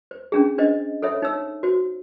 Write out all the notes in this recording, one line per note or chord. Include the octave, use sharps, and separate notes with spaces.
C5
C#4 D4 G#4
D4 C5 D#5
A4 C5 C#5 E5
D#4 C#5 E6
F#4 C5